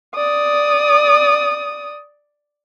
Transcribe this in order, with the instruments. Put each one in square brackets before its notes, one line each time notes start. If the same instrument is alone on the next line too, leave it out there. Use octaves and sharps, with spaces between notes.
[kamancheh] D5 D#6